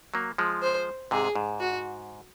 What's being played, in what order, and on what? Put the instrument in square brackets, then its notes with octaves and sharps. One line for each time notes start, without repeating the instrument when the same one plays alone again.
[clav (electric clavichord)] F#3 A#3
F3 G#3
[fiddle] C5
[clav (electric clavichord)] G#2 C3 [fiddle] G#4
[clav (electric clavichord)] G#2
[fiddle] F#4